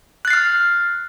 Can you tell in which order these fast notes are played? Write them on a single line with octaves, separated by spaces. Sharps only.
F#6 A6 C7 F6